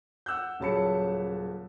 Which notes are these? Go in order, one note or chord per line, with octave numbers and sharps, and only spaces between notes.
F#5 E6 F#6 G6
D#1 C#3 F#3 A5 B5 C#7